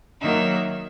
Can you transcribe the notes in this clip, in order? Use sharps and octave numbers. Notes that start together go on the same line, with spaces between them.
D#3 F#3 A#3 E5